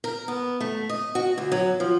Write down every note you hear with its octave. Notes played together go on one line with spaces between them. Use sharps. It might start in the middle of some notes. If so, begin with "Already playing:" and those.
A#4
B3
A3
D#5
F#4
D2
F#3
F3